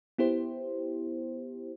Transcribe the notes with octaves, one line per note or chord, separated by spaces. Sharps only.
B3 E4 G4 C5